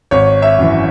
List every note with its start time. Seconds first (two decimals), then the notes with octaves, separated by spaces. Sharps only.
0.11 G#1 C#5
0.42 E5
0.59 F#2 E3